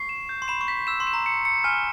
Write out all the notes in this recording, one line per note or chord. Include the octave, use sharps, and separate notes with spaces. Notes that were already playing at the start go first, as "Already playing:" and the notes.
Already playing: C#6 C7
E7
G6
C6
B5 E7
C#6
B6
E6 E7
C6
E7
A#5
C#7
C#7
G#5 F6